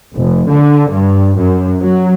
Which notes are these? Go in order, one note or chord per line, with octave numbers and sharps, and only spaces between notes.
F1
D3
G2
F#2
F#3